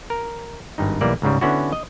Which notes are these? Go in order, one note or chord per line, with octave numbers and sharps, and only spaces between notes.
A#4
G#1 G2 D#4
B1 E3 G3 A#3 D5
C#2 G#2 C#3 G3
D3 B3 C#4 E4 F#4
D#5